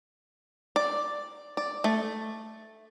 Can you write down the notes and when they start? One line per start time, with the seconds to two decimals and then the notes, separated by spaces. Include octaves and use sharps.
0.76 D5
1.57 D5
1.84 A3